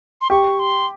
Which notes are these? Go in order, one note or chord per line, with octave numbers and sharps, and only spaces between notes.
C6
G4 C#6
C6